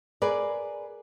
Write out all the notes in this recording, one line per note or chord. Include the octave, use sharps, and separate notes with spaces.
G#4 A#4 B4 D5